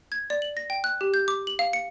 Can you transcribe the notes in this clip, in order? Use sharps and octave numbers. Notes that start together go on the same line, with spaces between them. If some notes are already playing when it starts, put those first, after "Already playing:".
G#6
D5
F#7
A#6
G5
F#6
G4
G6
D6
F#7
F5
C#7